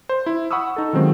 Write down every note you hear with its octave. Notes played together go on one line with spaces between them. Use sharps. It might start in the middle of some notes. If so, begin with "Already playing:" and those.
C5
E4
F#5 B5 C#6 D#6 E6
D#4 A4
D#3 F#3 G#3 C4 C#4 F4